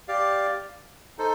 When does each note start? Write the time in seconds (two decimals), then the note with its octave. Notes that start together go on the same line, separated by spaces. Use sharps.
0.08 G4 D5 F5
1.18 D#4 A4 C5